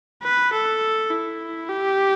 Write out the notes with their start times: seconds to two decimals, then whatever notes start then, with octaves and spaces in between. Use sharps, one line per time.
0.23 B4
0.53 A4
1.11 E4
1.69 G4